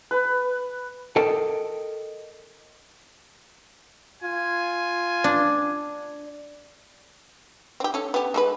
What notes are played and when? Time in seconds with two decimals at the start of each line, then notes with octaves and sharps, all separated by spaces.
0.11 B4
1.16 A4 A#4 D#5 G5 A5
4.23 F4 G#5
5.24 D4
7.80 C4 G4
7.94 C#4 A4
8.14 B3 G4
8.34 G#3 A4 B4